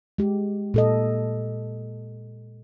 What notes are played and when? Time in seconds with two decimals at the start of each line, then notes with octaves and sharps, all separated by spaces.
0.18 G#3 G4
0.74 A#2 A4 D#5